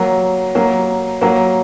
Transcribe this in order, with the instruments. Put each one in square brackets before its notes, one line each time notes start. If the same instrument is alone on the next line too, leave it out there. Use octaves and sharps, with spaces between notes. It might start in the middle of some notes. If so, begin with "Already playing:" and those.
Already playing: [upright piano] F#3 A#3
F#3 A#3
F#3 A#3